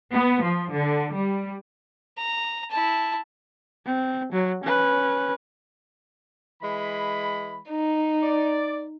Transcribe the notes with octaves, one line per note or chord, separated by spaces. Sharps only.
B3
F3
D3
G3
A#5
E4 A5
C4
F#3
C#4 B4
E3 G#3 B5
D#4
D5